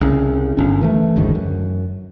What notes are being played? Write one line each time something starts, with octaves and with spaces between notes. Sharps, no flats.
C2 C#3 C#4
G1 C#4
D#3 E3 A3
F#1 D2 G#2 D#3
F#2